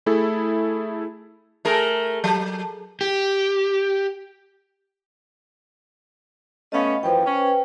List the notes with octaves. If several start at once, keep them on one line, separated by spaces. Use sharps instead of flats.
A3 E4 G#4 A4
A3 G#4 A#4
F#3
G4
A3 B3 C#4 D#5 F5
F#2 E3 F3 B4 C5 G5
C#4